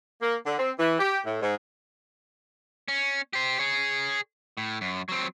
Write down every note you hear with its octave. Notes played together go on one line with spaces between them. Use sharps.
A#3
D3
C4
E3
G4
A2
G#2
C#4
G4 C5
G#4 C#5
A2
F#2
F#3 C4